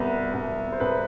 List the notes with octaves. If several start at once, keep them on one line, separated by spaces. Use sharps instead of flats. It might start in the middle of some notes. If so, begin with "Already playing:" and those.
Already playing: C2 B3
C2
C5
C2 B4